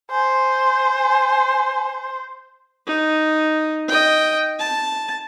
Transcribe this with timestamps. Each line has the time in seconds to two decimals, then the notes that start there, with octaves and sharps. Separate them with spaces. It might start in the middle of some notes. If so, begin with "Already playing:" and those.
0.11 C5 G#5
2.86 D#4
3.88 D#5 G5
4.59 A5